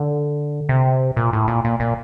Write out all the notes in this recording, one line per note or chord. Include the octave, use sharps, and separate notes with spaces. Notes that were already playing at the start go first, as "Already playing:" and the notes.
Already playing: D3
C3
A#2
A2
A#2
A#2
A#2